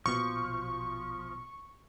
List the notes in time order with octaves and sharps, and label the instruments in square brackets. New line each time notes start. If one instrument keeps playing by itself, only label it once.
[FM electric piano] A#1 B2 [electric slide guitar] F3 [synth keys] C#6